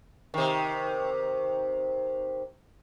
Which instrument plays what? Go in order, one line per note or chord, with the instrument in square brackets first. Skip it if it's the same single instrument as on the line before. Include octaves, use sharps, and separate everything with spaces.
[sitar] C3 D#3